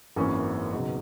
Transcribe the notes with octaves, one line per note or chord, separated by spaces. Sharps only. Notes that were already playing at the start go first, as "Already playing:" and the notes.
G#1 F#2 E3 A#3 C#4
C#2 B2 F#3 B3 D#4